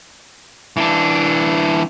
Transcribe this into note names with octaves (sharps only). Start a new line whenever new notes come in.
E3 D4